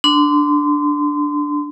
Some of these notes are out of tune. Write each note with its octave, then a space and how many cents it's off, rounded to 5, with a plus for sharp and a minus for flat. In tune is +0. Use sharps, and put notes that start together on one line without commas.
D4 +0 C6 -30